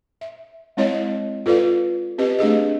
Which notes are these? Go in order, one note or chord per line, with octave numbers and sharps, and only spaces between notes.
E5
G#3 C4 E4 C#5 D#5
F4 A4 B4 D5 F5
C4 G4 B4 D#5
A3 D4 G#4 D#5